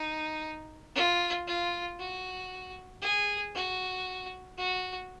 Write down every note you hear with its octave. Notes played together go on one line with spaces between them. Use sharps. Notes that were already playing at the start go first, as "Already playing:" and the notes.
Already playing: D#4
F4
F4
F#4
G#4
F#4
F#4